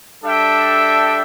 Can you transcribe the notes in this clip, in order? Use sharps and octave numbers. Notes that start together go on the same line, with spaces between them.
G3 D4 A4 E5 G5